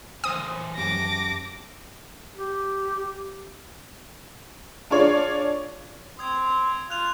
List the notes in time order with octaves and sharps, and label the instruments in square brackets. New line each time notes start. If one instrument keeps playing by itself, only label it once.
[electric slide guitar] E3 C5 G#5 [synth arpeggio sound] D#6
[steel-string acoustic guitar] F#2 G4 A5 [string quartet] D6 A#6
[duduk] G4
[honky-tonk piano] D4 F4 G#4 C#5 D5
[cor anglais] C4 [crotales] D#6 G#6
[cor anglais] F4 [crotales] F#6 F7